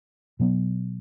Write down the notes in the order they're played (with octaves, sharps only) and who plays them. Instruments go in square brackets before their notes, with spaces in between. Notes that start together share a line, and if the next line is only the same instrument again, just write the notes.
[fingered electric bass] B2 F#3 B3